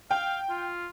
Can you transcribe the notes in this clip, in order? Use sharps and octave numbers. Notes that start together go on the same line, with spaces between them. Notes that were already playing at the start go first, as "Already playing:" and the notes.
F5 G5
F4